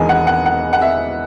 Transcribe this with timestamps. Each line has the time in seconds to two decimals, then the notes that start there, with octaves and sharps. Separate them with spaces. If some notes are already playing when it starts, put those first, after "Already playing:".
Already playing: E1 E2 D#3 G#3 G#5
0.09 F#5
0.27 F#5
0.46 F#5
0.73 F#5
0.81 E5